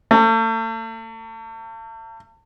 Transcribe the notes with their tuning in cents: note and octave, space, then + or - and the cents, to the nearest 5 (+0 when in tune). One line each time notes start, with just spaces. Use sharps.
A3 +40